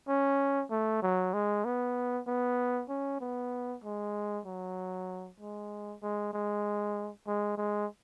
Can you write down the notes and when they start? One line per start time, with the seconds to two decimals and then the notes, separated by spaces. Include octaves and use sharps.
0.08 C#4
0.71 A3
1.02 F#3
1.34 G#3
1.65 B3
2.27 B3
2.89 C#4
3.20 B3
3.84 G#3
4.46 F#3
5.40 G#3
6.02 G#3
6.33 G#3
7.27 G#3
7.58 G#3